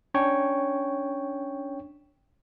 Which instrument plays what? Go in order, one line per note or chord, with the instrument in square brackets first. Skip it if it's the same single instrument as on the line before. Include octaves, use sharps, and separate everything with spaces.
[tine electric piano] C#4 D4 C#5 G5 C#6